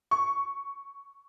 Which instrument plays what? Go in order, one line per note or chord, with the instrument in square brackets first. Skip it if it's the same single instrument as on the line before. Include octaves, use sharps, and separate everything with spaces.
[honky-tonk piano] C#6